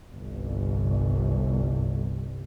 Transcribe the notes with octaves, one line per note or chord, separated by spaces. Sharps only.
G1 C2